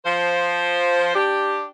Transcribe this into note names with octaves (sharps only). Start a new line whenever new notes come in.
F3 C5
D4 G4